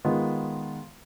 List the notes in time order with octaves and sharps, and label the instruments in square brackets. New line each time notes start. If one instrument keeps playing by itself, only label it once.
[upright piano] D#3 G#3 B3 F4